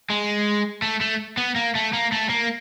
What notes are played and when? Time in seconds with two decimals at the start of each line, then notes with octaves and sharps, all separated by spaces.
0.10 G#3
0.82 A3
1.01 A3
1.37 B3
1.56 A#3
1.75 A3
1.93 A#3
2.12 A3
2.29 A#3